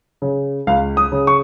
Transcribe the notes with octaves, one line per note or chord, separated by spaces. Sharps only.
C#3
C#2 F5
D#6
C#3
C#6